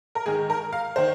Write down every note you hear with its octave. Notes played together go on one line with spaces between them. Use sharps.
A#4
G#2 D#3 G#4
A#4
F5
D#3 C5